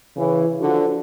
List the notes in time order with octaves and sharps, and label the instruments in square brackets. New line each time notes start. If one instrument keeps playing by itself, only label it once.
[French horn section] C#3 E3
D3 F3 F#4